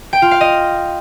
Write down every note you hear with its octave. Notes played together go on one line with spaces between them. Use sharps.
G5
F4
F5
D#5